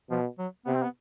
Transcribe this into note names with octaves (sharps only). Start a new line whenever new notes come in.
B2 F3
F#3
C3 B3
C4
B3